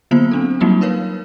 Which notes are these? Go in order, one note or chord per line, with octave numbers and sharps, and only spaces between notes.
D3 F#3 A#3 B3 F4 C5
C4 D4 A4
F#3 G3 A#3 D#4 F4 F#4
A#4 B4 C#5 F5